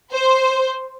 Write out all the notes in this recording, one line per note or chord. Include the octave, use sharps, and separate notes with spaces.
C5